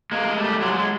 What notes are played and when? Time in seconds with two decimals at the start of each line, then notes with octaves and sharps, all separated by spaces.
0.12 G#3 A#3
0.27 G#3
0.37 G3 A3
0.61 F#3 G#3
0.75 G#3